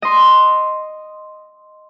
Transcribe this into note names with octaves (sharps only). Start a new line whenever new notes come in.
D#5 C6